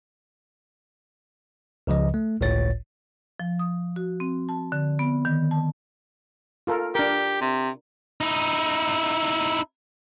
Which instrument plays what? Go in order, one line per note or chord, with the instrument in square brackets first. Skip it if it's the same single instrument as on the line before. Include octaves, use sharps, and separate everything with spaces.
[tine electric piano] C#2 C#3 F3 D#5
A3
G1 C#2 A2 C#5 A6
[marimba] F3
D#6
F#4
C4
A5
D3
B3
D#3
A5
[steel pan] F4 A4 A#4
[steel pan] D4 A#4 [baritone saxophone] G4
[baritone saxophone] C3
[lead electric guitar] D#4 E4